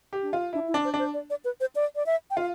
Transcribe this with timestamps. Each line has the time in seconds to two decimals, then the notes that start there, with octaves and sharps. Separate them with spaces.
0.13 G4
0.22 D4
0.33 F4
0.53 D4 E4
0.68 E4
0.74 D4
0.85 C5
0.94 D4
0.99 C5
1.14 D5
1.30 D5
1.45 B4
1.60 C5
1.75 D5
1.96 D5
2.06 E5
2.31 G5
2.37 F4 F5